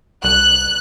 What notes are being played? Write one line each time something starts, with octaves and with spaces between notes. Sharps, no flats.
C2 F#6